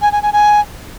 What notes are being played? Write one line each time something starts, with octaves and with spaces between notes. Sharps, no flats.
G#5
G#5
G#5
G#5